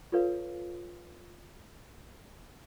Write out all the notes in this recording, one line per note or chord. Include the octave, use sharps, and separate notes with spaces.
F4 A4 B4 C#5 F5